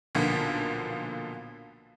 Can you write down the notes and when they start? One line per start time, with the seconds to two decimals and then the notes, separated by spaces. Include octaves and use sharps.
0.15 B1 A#2 D3 F3 A#3 B3